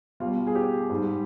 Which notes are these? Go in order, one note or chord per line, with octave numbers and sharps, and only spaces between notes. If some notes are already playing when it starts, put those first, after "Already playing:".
B2 G3 F4
G#4
G4
G#2 G3